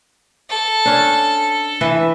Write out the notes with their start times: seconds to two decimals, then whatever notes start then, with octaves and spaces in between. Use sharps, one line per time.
0.49 A4
0.85 C#4 D4
1.81 E3 B4 E5